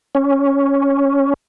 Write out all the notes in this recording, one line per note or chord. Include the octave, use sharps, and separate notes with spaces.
C#4